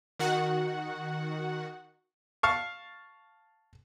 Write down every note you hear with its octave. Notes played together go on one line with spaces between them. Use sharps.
D#3 F#4 F#5
F5 A5 C#6